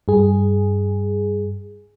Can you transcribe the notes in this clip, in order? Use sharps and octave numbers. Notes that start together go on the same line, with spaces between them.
G2 G#4